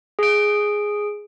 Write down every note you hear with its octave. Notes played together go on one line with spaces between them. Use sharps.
G#4 D7